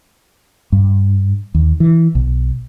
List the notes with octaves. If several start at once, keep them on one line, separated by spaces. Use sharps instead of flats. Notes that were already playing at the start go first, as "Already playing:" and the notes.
G2
D#2
E3
B1